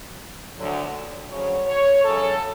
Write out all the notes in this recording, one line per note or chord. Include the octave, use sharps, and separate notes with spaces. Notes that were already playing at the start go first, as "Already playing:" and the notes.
D2 D3 F#3
D2 C#3 F#3 C#5
C#5
F#2 C#3 F#3 A4